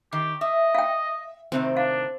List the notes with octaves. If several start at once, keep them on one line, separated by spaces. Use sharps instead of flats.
D#3 G4
D#5 E5
F5 G5
A2 C3 D#3 C4
D4 F5